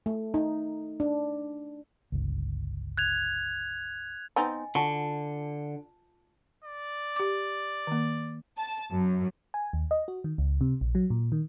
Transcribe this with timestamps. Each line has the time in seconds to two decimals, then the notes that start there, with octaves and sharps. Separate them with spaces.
0.06 A3
0.34 D#4
1.00 D4
2.12 G1 C#2
2.97 F#6 G#6 F7
4.36 B3 C4 D#4 D#5 G#5
4.75 D3 F4 F#4 A5
6.64 D5
7.16 G4 D6
7.87 D#3 A#3
8.59 A5
8.94 F#2
9.54 G#5
9.73 D#2
9.91 D#5
10.08 F#4
10.24 D#3
10.38 C#2
10.61 C3
10.81 A#1
10.95 F#3
11.10 A#2
11.32 D#3